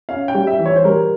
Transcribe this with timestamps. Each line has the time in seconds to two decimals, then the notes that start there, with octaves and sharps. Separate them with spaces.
0.09 C#4 F5
0.28 G5
0.34 G3
0.47 E5
0.59 E3
0.66 C#5
0.76 C5
0.85 G3 A#4